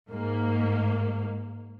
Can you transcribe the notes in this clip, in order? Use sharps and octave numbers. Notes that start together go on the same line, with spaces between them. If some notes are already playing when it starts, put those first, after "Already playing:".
G#2 A#3